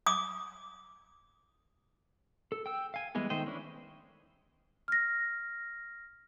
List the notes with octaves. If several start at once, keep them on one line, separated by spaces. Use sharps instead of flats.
D6 D#6
A4
G5 E6
F5 G#5
E3 G3 G#3 B3 G#4
D#3 A3 C5 D#5 G5
E3 C#4 D4 E4
F6 A#6